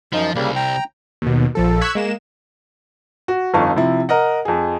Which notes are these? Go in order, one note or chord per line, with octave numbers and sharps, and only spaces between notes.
F#2 F3 D#4
C2 C#3 G3 A#3
G5 A#5
D#2 B2
A#1 F3 A4
C#6 E6 F#6 G#6 B6
G#3 A#3 E7
F#4
G1 F2 D#4 F5 C#6
C3 F3 E4
A#4 D#5 F#5
F2 G#4